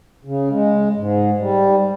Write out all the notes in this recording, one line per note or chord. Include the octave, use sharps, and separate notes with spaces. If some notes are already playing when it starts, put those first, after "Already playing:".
C#3
G#3
G#2
G3